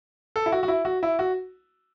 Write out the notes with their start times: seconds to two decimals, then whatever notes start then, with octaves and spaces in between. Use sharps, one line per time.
0.36 A4
0.46 E4
0.52 F#4
0.63 F#4
0.68 E4
0.85 F#4
1.03 E4
1.19 F#4